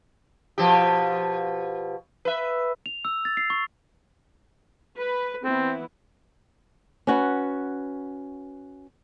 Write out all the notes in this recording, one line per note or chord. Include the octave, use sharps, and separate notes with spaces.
B2 F3 G4
B4 E5
F7
E6
A6
C7
C#6
B4
E3 B3 C4 E4
C#4 F#4 B4